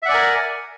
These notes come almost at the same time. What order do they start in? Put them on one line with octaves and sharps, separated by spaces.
E5 F#5 D5 G#5 A#4